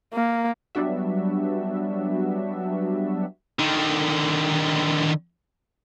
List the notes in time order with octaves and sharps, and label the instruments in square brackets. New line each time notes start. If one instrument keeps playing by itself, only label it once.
[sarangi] A#3
[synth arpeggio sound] F#3 G3 B3 D4 F#4 E5
[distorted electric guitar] D3 D#3